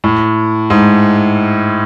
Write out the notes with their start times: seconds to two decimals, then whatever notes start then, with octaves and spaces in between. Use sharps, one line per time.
0.04 A2
0.70 G#2